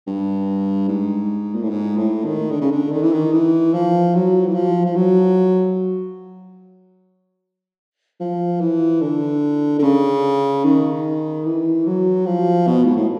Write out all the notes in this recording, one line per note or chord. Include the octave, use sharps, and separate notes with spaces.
G2
G#2
A#2
A2
G#2
A2
D#3
D3
C#3
D3
D#3
E3
D#3
E3
F3
F#3
E3
F3
F3
F#3
F3
E3
D3
D3
C#3
D#3
E3
F#3
F3
B2
G#2
A2